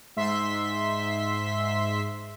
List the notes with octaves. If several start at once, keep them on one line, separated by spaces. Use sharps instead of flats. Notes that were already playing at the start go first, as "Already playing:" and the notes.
G#2 E5 C6 B6